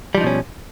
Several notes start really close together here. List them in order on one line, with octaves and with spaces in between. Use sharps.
G3 F3 D#4 B2 C#4